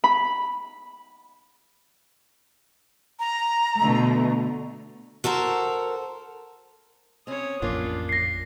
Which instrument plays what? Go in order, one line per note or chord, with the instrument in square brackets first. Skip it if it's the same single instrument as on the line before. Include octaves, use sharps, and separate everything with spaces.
[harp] B5
[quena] A#5
[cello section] B2 D3 A3
[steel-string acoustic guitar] F#4 A4 A#4 C5
[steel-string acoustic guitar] C4 C#4 [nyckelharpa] C#5 D#6
[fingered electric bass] A1 F2 [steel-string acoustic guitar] A#3 C#4 F4 [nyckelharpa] D4
[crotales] A#6 C7